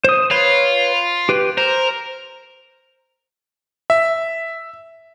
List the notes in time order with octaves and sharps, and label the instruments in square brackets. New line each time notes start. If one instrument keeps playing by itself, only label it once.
[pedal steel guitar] C5 D#6
[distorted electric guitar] F4 [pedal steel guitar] B4 C#5 B5
[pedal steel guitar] G4 B4
[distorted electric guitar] A#4 [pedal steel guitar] C5
[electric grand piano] E5